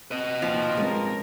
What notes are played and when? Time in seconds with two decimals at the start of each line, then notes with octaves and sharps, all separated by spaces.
0.11 C4 B4 D#5
0.42 D#2 F3 G5
0.77 G2 G#3 C4 C#4 A#4